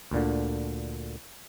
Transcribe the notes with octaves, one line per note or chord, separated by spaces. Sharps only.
D2 A#2 D3